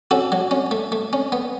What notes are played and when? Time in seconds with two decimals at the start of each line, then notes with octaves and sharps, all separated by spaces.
0.11 C#4 F#4 A4
0.32 F#3
0.51 C#4
0.71 A3
0.92 A3
1.13 C#4
1.32 B3